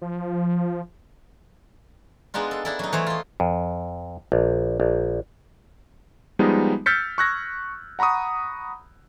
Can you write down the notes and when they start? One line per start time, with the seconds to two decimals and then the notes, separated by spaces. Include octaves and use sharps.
0.02 F3
2.34 G#3 B3 D4 D#4 F4
2.51 A4
2.65 D4 E4 A4
2.79 F#3 D#4
2.93 E3 A3 C5 C#5
3.07 F4 D#5
3.40 F2
4.32 A#1
4.80 A#1
6.39 F3 G3 G#3 B3 D#4
6.86 E6 F6 G6 A6 B6 C#7
7.18 C#6 E6 F#6 G#6 A#6
7.99 F#5 A#5 B5 C#6 D#6